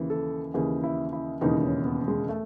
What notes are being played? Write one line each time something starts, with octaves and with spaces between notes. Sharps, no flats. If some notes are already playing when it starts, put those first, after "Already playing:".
Already playing: D#2 C#3 E3
A4
D#2 C#3 E3 G#4
E4
E4
E1 D#2 C#3 E3 D#4
C#4
B3
G#3
A3